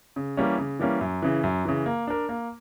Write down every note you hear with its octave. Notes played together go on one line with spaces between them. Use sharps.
C#3
E3 G3 A#3 C#4
C#3
E3 G3 A#3 C#4
F#2
C#3 E3
F#2
C#3 E3
A#3
D4 A#4
A#3